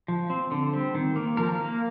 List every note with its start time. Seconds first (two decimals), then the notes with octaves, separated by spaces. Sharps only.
0.08 F3
0.30 C4
0.51 D3
0.73 G3 C4
0.95 D#3
1.16 A#3
1.37 F3 A#4
1.59 A#3